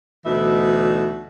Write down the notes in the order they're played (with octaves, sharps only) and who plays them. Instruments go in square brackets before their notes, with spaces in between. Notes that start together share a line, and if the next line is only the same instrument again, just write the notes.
[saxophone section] D2 B2 E3 D#4 E5